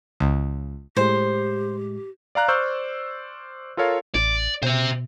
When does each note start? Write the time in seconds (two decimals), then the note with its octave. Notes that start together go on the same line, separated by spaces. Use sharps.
0.20 C#2
0.97 A2 G#3 G4 C5
2.35 D5 F5 A#5 F#6
2.48 C5 D5 C#6 E6 F6 G6
3.77 F4 A4 A#4 C#5 F5
4.15 A1 D5
4.63 B2 C5 E5